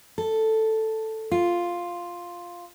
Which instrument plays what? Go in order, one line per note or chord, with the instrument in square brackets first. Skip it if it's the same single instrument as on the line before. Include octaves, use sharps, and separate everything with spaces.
[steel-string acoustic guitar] A4
F4